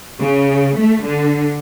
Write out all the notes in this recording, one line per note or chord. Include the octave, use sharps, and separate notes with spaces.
C#3
A3
D3